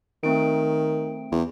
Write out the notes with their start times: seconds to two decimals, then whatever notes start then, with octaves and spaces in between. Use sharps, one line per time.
0.23 D#3 A3 C4 D7
1.32 E2